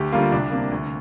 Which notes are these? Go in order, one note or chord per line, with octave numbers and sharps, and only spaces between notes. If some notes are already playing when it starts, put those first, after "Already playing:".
Already playing: D2 G4
D3 G3 A#3 F4
C2 D4
C3 A#3
D2